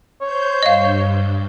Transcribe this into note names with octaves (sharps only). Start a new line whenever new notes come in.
C5 C#5 G6
G2 D#5 F5